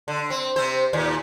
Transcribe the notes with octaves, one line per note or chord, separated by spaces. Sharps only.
D3
C4
C3 C4 C5
D#2 A#2